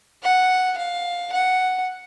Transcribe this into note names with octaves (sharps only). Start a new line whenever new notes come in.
F#5
F5
F#5